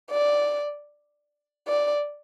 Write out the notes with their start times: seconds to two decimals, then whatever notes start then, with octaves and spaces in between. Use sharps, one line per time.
0.11 D5
1.68 D5